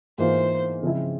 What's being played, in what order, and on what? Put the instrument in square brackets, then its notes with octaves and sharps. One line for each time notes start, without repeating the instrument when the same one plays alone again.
[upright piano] G#2 E3 A#3 F4 [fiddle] C5
[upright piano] C#3 F3 G#3 C4 E4